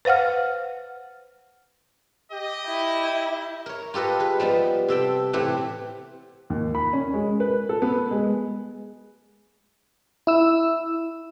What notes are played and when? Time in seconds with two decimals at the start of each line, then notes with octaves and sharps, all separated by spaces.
0.05 B4 C5 F5 F#5 F6
2.32 G4 D#5
2.67 E4
3.66 A#4 C#5
3.94 F4 G4 A4 B4 D#5
4.19 G#3 B4
4.40 F3 G3 B3 D#4
4.88 C3 A4 E5 G5
5.33 A2 C3 E3 A3 G4 F#5
6.50 D#2
6.75 B5
6.93 C#4
7.14 G#3
7.40 B4
7.69 A4
7.82 B3
8.11 G#3
10.27 E4 E6